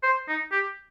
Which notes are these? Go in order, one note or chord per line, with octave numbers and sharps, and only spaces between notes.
C5
D#4
G4